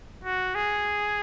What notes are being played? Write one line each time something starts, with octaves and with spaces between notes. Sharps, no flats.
F#4
G#4